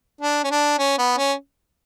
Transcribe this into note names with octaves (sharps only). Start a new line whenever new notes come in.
D4
C#4
D4
C#4
B3
C#4